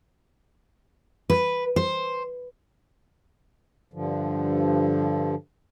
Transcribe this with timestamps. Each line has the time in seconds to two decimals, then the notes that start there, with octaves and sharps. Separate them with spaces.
1.30 B4
1.76 C5
3.93 G2 D3 F3